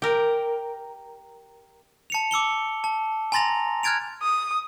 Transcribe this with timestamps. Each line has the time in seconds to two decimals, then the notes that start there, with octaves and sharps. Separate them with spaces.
0.02 G4 A#4
2.10 A5 C#7 F7
2.31 D6 E6 C#7 G7
2.84 A5
3.32 G#5 A#5 C6 A6 A#6 F7
3.83 F6 F#6 G#6 A6 D7 F7
4.22 D#6